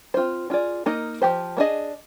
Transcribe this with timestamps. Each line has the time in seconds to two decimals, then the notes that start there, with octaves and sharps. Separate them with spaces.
0.14 C4 F4 C5
0.50 D4 F4 G#4 D5
0.86 A#3 D#4 A#4 D#5
1.22 F3 C4 G4 C5
1.57 A#3 D4 G#4 D#5